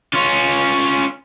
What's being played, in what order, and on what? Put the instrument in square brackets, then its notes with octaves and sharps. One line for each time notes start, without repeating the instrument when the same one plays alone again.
[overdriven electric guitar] C#4 F4